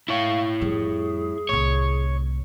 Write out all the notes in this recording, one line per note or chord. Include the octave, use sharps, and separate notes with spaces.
E4 C#5 F5
F2 G3 G#4
C2 A2 C#5